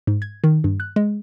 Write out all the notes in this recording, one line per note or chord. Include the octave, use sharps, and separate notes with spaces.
G#2
G#6
D#3
G2
F#6
G#3